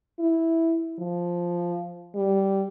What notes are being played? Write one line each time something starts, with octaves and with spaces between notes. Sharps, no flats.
E4
F3
G3